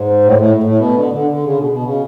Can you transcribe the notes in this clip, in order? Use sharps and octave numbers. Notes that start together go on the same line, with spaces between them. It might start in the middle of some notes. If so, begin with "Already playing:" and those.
Already playing: G#2
A2
A2
A2
B2
D3
D3
D3
C#3
B2
B2
C#3